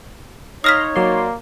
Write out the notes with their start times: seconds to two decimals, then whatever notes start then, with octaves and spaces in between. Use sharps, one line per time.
0.64 D#4 C#5 F5 A#5 C6 D#6 F6 B6
0.96 F#3 A#3 D5 C6